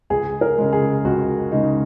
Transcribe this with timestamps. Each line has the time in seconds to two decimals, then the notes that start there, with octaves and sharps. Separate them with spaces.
0.10 C#2 G#4
0.41 A#4
0.58 C#3 G#3
0.73 G#4
1.05 C#2 F#4
1.51 C#3 G#3 D#4